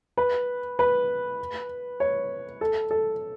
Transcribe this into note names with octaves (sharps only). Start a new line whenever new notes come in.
B4
B4
C#5
A4
A4